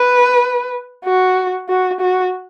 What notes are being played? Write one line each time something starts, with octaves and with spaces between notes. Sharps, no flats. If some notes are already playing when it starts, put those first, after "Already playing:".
Already playing: B4
F#4
F#4
F#4